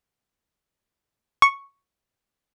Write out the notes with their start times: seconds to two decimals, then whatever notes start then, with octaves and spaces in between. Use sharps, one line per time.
1.42 C#6